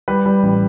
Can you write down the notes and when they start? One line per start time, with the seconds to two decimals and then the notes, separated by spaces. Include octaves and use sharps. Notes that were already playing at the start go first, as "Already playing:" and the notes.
0.08 G3 B4
0.26 G3
0.43 A1